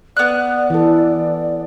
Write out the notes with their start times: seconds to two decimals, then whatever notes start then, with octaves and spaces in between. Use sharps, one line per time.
0.17 B3 D5 F#6
0.70 E3 A4